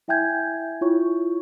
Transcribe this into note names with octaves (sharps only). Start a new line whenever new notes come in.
E4 E5 G5 G#5 G6 G#6
E4 F4 C#5 C#6